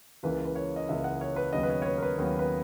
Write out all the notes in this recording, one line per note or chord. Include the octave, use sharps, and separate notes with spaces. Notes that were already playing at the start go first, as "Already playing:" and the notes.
C#2 C#3 E3 A#3 B4
B4
C#5
D#5
C#2 C#3 E3 A#3 E5
F#5
C#5
B4
D#2 C#3 F#3 B3 D#5
B4
C#5
C#5
B4
A#4
B4
D#2 C#3 F#3 B3 C#5
B4